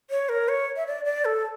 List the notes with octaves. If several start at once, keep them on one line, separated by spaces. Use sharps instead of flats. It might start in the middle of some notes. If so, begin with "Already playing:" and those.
C#5
A#4
C#5
E5
D5
D5
A4